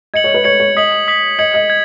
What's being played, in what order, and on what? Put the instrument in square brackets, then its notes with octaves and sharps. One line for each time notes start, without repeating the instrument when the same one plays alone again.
[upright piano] D#5 [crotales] G#6 C#7 F#7
[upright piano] C#5
B4
[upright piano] C#5 [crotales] G#6 C#7 F#7
[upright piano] C#5
[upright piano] D#5 [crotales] D#6 B6 F#7
[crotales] D#6 B6 F#7
[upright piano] D#5 [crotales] G#6 C#7 F#7
[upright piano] D#5
[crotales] G#6